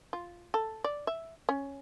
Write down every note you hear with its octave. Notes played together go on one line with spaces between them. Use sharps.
F4
A4
D5
E5
C#4